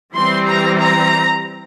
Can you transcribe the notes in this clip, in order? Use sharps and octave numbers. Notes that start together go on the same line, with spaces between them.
E3 G3 C4 C6
A#5
A#5